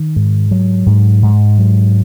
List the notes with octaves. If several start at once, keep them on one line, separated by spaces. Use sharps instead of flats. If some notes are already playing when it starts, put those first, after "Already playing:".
Already playing: D#3
G#2
F#3
G#2
G#2
F#3